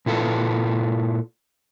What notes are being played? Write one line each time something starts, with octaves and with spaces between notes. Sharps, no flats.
A#2 E4 F4 A4 B4